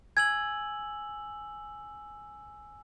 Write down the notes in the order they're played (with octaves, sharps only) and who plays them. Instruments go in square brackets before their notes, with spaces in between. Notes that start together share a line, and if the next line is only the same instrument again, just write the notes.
[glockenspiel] G#5 E6 F#7 [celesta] G#6